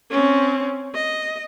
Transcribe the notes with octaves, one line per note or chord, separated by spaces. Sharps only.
C4 C#4
D#5